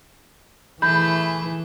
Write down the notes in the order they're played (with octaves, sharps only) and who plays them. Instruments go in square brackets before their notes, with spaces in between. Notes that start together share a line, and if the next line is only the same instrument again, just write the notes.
[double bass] E3 [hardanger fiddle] A3 G#4 [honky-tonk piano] B5 [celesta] G6